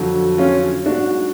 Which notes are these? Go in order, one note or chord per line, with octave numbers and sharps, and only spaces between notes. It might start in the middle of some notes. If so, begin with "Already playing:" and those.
Already playing: F2 D3 F#3
C#4 F4
G#2 F#3 D4 F#4